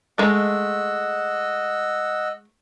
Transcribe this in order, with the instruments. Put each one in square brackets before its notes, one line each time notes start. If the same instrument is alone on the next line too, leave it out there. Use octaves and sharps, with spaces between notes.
[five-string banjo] G#3 A3 [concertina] D#5 F#5 E6